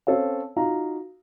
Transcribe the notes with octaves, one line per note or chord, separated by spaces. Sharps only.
C4 C#4 A4 C#5 F5
D#4 F4 F#4 F5 A#5